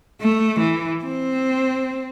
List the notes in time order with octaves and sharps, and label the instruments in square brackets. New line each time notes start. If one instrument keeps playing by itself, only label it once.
[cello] A3
E3
C4